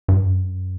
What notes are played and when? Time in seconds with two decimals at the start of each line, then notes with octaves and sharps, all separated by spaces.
0.08 G2
0.26 F#2